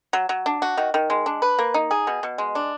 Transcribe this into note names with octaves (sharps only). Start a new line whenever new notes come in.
F#3
F#3
D4
F#4
D#3
D#3
G#3
D4
B4
A#3
D#4
G#4
B2
B2
G#3
D4